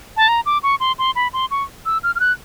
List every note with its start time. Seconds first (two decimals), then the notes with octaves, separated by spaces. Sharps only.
0.17 A5
0.28 A#5
0.46 D6
0.63 C#6
0.80 C6
0.99 C6
1.16 B5
1.33 C6
1.51 C#6
1.86 E6
2.03 F6
2.15 F6
2.20 F#6